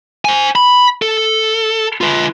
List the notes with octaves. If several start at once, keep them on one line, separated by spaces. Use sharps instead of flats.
C5 G#5
B5
A4
F4 B4